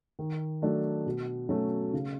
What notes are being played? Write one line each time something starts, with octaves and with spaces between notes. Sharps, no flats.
D#3
F#3 A3 D4
B2
F#3 A3 C#4 F#4
C#3